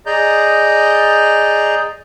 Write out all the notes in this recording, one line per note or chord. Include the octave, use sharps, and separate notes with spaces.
G#4 D5 D#5 A#5 G6